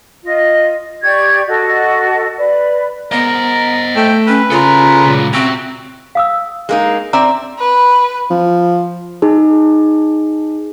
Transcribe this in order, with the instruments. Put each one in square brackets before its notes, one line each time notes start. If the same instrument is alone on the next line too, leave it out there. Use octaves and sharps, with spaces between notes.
[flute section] F4 D#5
G4 D5 C#6 G#6
F#4 A4 D#5
B4 D5
[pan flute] B3 [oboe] A#4 [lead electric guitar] C5 D#5
[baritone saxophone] A3 [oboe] G5
[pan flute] C#4 [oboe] B4
[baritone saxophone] C#3 [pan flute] F4 [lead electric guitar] A4 A#5
[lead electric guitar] C#2 A#2
[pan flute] C4 [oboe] F#4 [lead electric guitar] G4 E5
[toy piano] F5 D#6 E6
[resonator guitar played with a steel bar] G#3 A#3 D#4
[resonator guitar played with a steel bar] C4 D5 E5 [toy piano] A#5
[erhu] B4
[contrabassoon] F3
[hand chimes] D#4 G#4